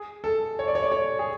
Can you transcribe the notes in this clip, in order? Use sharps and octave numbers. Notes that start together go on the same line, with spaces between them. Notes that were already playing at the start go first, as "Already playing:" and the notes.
Already playing: G#4
A4
C#5
D5
C#5
D5
C#5
G#4